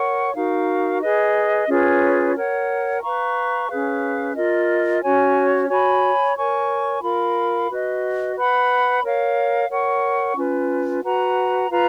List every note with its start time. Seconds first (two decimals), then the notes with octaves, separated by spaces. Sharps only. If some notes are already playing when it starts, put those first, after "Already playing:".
Already playing: A#4 C#5 F#5 C#6
0.35 D#4 F#4 A#4 F5
1.01 G#4 B4 D#5
1.68 C#4 F4 G#4 B4
2.35 A#4 C#5 F#5
3.02 B4 F5 A#5 C#6
3.68 C#4 G#4 B4 F5
4.35 F4 A#4 D#5
5.02 C#4 F#4 C#5 G#5
5.69 F#4 C#5 G#5 B5
6.36 A#4 C#5 G#5 C#6
7.02 F4 A#4 F5 B5
7.69 F#4 B4 D#5
8.36 B4 F#5 B5
9.03 A#4 C#5 F5
9.70 A#4 C#5 F#5 C#6
10.37 C#4 F4 B4
11.04 F#4 B4 F#5 A#5
11.70 F4 B4 F5 A#5